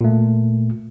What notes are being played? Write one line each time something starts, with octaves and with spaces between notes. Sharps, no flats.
A#2 A3